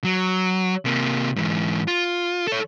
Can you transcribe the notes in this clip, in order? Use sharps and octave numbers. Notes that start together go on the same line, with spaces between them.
F#3
C3 A#3
G#2 E3
F4
A4 C#5